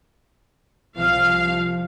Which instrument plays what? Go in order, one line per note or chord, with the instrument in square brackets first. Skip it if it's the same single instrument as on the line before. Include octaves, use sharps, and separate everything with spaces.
[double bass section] C2 F3 [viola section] F5